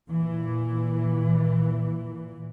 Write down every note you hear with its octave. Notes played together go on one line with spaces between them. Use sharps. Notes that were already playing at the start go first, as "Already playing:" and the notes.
A#2 E3